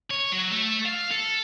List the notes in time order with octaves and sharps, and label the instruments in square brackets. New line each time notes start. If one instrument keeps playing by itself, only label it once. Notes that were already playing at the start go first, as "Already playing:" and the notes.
[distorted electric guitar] C#5
F#3
A3
F5
A4